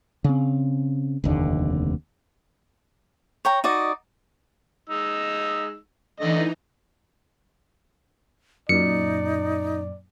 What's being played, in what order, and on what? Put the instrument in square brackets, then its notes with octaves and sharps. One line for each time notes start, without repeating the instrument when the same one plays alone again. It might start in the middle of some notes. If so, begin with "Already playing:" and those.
[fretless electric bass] C#3 C4
F1 D#2 D3
[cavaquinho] C#5 G5 A#5
D#4 F#4 D5 D#5
[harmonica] G#3 D#4 E6
[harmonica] D3 A3 D#5 [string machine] E3 D#4
[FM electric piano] F#2 A#2 [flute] D#4 [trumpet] D5 [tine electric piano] C#7